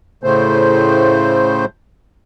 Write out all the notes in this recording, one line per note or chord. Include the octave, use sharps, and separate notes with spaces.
A2 C#3 A3 C5